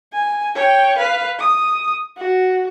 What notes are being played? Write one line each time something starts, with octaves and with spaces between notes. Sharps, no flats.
G#5
C#5 G5
B4 F5
D#6
F#4